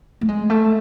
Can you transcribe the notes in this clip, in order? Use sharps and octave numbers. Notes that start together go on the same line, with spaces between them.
A3
G#3
A3